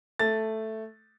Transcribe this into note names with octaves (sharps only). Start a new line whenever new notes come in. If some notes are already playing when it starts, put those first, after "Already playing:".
A3 A6